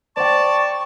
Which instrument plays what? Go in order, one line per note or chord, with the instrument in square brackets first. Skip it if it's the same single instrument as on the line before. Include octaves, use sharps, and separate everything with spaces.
[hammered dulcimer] C5 G5 [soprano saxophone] D5 [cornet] A5 [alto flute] C#6